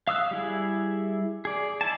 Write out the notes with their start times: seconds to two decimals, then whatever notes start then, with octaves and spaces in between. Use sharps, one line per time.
0.08 F5 D#6 E6 F#6
0.31 G3 E4 G#4
1.45 G#4 D5
1.81 D#4 E4 G#5 A5